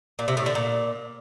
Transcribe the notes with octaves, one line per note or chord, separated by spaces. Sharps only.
A#2
C3
A2
D3
A#2